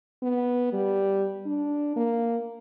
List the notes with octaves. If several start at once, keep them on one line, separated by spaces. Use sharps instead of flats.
B3
G3
D4
A#3